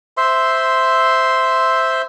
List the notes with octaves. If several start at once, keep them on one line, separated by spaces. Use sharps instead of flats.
C5 E5 C6